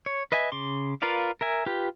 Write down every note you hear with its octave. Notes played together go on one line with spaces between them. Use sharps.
C#5
B4 D#5 E5 G#5
C#3 C6 D6
F4 A#4 B4 D5 F5
A#4 E5 G#5
F4 G4 B4